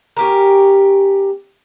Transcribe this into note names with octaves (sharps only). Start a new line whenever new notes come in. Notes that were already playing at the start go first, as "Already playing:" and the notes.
C#4 G4 A#4